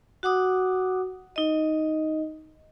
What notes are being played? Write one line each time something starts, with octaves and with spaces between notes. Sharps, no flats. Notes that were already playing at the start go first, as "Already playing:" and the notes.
F#4 F#5 D6 D#6
D#4 D#5